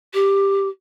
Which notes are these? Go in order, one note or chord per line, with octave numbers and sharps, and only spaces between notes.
G4